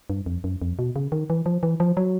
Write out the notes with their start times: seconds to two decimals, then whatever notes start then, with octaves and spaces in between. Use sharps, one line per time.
0.10 G2
0.26 F2
0.44 F#2
0.62 F2
0.79 B2
0.96 C#3
1.12 D#3
1.30 E3
1.46 F3
1.63 E3
1.80 F3
1.97 F#3